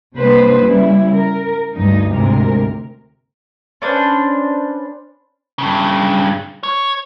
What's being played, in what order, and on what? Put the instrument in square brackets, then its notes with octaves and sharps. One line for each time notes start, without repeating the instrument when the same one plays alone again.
[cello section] C3 G3 A#3 D4 B4 C5
C#3 G3 E4
A#4
D2 G2 D#4
D2 G#2 C3 A#4
[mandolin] C#4 D4 B4 C5
[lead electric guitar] G2 C#3
C#5